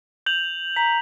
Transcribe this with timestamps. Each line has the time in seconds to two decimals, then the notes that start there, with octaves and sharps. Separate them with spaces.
0.26 G6 F7 F#7
0.76 A#5 B6